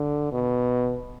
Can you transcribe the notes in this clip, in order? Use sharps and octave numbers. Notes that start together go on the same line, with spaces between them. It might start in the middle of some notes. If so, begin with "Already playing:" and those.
Already playing: D3
B2